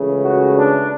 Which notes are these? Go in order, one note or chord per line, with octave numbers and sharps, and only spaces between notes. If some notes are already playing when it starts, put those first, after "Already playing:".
Already playing: C#2 C#3 E3 A3
F#4
D4